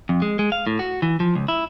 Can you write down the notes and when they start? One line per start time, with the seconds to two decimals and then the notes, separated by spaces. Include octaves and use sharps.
0.09 F2
0.22 G#3
0.39 G#3
0.52 F5
0.67 A2
0.79 F#4
1.02 E3
1.20 F3
1.35 C#2
1.48 E4